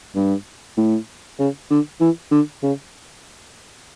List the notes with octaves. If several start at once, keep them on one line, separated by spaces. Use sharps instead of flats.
G2
A2
C#3
D3
E3
D3
C#3